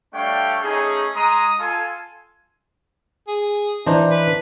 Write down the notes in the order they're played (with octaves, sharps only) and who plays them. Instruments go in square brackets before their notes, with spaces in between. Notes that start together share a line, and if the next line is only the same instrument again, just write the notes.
[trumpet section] G3 A3 D4 C#5 F5 G5
A3 C#4 D#4 G#4
G#3 A#5 D#6
F4 A4 G#5
[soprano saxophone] G#4
[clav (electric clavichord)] E3 D4 C5 [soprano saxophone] D#4
[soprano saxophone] B4